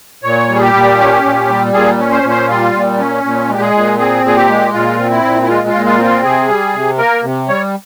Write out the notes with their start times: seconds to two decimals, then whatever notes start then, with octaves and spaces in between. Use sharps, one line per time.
0.24 A#2 C#5
0.49 G3
0.54 G#4
0.61 G4
0.74 A#2
0.98 C#4
1.24 A#2
1.48 G3
1.73 A#2 G#4
1.99 C#4
2.11 C5
2.23 A#2
2.30 C5
2.48 G3 F4
2.73 A#2
2.98 C#4
3.24 A#2
3.48 G#3
3.54 G4
3.61 G#4
3.74 A#2
3.98 C4 G#4
4.24 A#2 G#4
4.36 G4
4.49 G#3
4.73 A#2 F4
4.98 C4
5.11 E4
5.23 A#2
5.42 E4
5.48 G#3 F4
5.67 F4
5.74 A#2
5.86 F4
5.98 C4
6.04 F4
6.23 C3 G#4
6.48 G3
6.74 C3
6.98 A#3 A#4
7.23 C3
7.48 G3 C#5